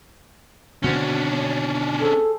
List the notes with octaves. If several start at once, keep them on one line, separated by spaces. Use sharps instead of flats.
B2 D3 D#3 C#4 D4 F#4 C5 C#5
G#4 A4 C5 A5